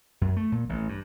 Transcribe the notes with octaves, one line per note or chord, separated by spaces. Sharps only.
F#2
A3
A#2
A1
G2